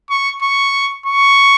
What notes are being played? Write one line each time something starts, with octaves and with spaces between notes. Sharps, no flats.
C#6
C#6
C#6